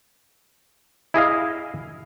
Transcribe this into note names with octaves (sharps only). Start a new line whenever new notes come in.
E4 G#4 D#5 F5